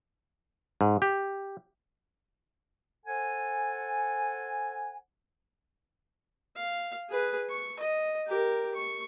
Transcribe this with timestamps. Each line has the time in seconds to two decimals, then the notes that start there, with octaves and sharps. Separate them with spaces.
0.81 G#2
1.02 G4
3.06 A4 C5 F#5 G#5
6.56 F5
7.09 G#4 B4
7.50 C#6
7.79 D#5
8.27 G4 A#4
8.75 C#6